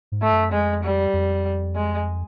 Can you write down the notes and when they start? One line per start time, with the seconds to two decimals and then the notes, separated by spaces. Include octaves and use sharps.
0.12 G#2
0.22 A3
0.32 F#2
0.52 F2 G#3
0.83 G3
1.13 F2
1.75 G#3